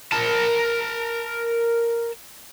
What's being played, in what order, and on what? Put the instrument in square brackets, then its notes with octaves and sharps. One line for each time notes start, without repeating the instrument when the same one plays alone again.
[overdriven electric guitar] A#4 A5